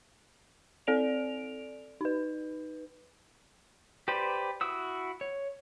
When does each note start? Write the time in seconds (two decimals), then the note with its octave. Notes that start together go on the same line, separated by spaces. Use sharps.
0.87 C4 A4 D5 D7 F7
2.01 D#4 B4
4.08 G4 B4 C5 D5
4.61 E4 F#4 D#6 E6
5.21 C#5